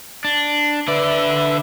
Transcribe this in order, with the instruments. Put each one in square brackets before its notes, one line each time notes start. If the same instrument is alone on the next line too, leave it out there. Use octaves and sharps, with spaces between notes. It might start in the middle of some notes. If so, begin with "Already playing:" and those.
[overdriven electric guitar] D4
[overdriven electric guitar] D3 D5 [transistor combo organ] B4 E5